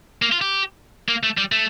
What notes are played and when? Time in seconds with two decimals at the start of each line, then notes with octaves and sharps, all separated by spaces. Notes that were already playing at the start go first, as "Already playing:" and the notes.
0.22 A#3
0.32 F4
0.41 G4
1.08 A#3
1.23 A3
1.38 G3
1.52 A3